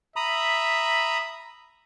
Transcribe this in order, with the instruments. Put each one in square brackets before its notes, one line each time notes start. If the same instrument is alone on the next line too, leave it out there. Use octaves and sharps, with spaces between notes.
[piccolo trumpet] E5 [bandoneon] A#5 B5 D#6